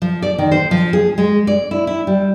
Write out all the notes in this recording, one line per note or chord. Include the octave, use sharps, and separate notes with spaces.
F3
D5
D#3
C5
F3
G#4
G#3
D5
E4
E4
G3